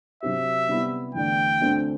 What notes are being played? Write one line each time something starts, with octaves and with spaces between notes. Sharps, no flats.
C3 F#3 C4 G4 E5
C3 G3 B3 E4
E2 D3 A3 D4 G5
D2 D3 A3 C4